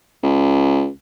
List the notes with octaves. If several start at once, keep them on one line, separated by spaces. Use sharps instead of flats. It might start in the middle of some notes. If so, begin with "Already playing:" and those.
C#2